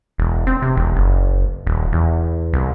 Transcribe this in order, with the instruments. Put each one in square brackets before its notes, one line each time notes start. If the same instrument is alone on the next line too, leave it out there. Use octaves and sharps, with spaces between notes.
[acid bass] E1
C4
C3
E1
F#1
D#1
E2
C2